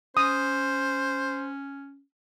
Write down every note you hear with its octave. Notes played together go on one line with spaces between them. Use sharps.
C#4 C5 D#6